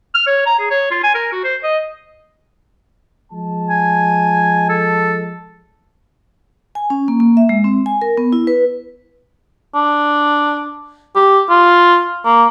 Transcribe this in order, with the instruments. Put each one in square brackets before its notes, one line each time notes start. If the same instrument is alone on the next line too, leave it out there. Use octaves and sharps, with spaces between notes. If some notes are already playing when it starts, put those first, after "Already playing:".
[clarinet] F6
C#5
A#5
G#4
C#5
F4
G#5
A#4
F#4
C5
D#5
[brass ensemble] F3 G#3 A5
[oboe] G#5
A4
[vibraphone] G#5
C#4
A#3
A#3
E5
G#3
C4
G#5
A#4
B3
E4
B4
[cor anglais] D4
G4
F4
A#3